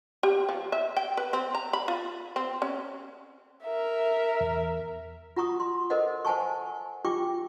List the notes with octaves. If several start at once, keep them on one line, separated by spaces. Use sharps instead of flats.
G4
F3
E5
G5
B4
C4
A#5
B5
F4
C4
C#4
A#4 E5
E2
F4 F#5 A#5 C#6 D#6
C6
A4 A#4 C5 D#5 F#5
C5 F#5 G#5 A5 C#6
F4 G4 G5 C#6 D6